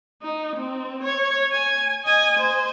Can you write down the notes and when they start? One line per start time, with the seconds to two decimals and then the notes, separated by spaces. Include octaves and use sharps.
0.22 D#4
0.56 C4
1.03 C#5
1.52 G#5
2.05 D#5 G#5
2.37 C5